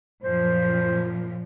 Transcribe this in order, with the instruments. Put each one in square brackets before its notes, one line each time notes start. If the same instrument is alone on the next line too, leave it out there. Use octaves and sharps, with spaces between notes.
[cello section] F#2 A#2 F3 [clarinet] C5